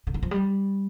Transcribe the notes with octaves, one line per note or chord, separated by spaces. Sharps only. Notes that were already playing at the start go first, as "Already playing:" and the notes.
D3
D#3
F3
G3